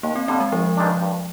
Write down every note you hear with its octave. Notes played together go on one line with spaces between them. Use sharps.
D#2 A#3
C4
D3 G3 C4 D4
G#3
G#1 F3
G2 D#3 G#3 D4
G2